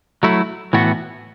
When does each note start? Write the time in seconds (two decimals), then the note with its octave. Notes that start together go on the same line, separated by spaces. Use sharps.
0.23 F#3 A3 E4
0.73 A2 E3 B3 F#4